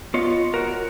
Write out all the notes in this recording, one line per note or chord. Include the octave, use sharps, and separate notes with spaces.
B3 F4 C#5 D#5
F#4 A#4